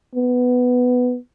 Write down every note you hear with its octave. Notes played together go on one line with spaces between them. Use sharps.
B3